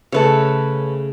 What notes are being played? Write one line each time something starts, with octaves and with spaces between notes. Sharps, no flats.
C#3 A3 A4 B4 C#5